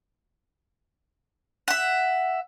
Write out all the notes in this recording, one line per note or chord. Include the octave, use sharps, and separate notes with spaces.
E5 F#5